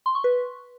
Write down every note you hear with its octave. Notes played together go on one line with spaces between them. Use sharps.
C6
C#6
B4